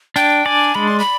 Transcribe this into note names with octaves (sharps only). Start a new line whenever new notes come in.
D4 G5
D5 G#5
G#3 B5
C6
B5